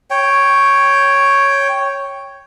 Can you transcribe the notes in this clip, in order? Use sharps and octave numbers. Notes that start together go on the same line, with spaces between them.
C#5 G5